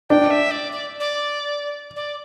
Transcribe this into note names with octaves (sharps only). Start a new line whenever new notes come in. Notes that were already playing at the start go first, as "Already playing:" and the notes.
D4 G5
E5
D5
D5
D5
D5